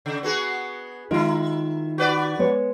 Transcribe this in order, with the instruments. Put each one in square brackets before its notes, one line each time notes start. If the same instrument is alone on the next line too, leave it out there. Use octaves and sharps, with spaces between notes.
[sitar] C#3
B3 F#4 G#4
[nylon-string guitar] D#3 G#3 F4 [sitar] E4 A#4
[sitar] F#4 B4 D5
[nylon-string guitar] G#3 B3 C#5